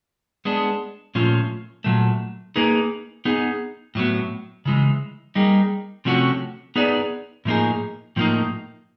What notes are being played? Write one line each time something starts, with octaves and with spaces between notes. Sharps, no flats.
G#3 B3 D4
A#2 F3 A3 C#4 F4
A#2 F#3 A3
A#3 D#4 G#4 B4
B3 D#4 G#4
A2 F#3 B3
C#3 E3 G#3
G3 A#3 D#4 G#4
C3 F3 A3 C#4 F#4
B3 D#4 G#4 B4 D5
A2 F3 A#3 D#4 G#4
A2 F3 A#3 D#4